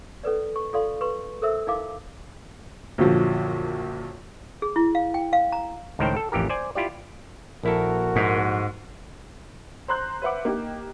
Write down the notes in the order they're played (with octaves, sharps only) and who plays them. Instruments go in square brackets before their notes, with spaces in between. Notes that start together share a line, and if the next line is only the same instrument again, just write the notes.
[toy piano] C#4 A4 B4 D5
C#6
F4 A4 D5 F5 C6
B4 C6 C#6
A4 A#4 C5 E5 E6
D#4 E4 A#4 F5 D6
[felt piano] A#1 F#2 D3 F3 F#3
[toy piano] G#4
E4
F5
G5
F5
A#5
[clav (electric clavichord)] C#2 A2 D#3 A#4 C5 G5
A4
A1 F2 E3 G4 A#4
C5 D5 G#5
E4 F4 G4 D5
[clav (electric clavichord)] A#1 E4 A4 [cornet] F#4 [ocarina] A#4
[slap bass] G#2
[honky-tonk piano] C5 A#5 C6 F#6 G6
B4 C5 E5 F#5 D6
A#3 D#4 G4